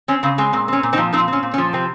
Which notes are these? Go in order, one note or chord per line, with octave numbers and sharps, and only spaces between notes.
C4 C#4
C#3 C4
G#3 C4
A#2 C4
C4 C#4
A#2
C4 D#4
F3
A#2 C4 D#4
C4 C#4
A#2
C#4
F3
C3 C4